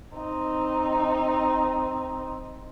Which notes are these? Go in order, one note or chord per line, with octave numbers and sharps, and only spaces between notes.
C4 D#4